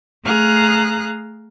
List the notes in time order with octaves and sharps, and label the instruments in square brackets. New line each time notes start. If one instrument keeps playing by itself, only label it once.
[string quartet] A3 G#4 F5 A#5 F#6